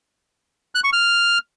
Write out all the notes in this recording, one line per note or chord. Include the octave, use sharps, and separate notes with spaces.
F#6
C#6
F6